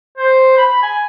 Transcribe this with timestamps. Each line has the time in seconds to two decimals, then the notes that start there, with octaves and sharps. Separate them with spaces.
0.18 C5
0.57 B5
0.82 G#5